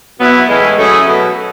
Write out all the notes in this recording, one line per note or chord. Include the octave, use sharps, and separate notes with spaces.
B2 F#3 B3 E4
A2 E3 G#3 C#4 E4
F#3 A3 C#4 E4 G#4
B2 F#3 B3